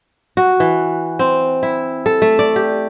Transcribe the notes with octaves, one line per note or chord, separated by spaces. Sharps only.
F#4
E3
C4
E4
A4
A3
D5
G4